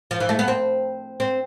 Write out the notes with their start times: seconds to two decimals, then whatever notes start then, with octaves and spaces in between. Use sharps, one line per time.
0.11 F3
0.20 E3
0.29 A3
0.39 B3
0.48 C4
1.20 C4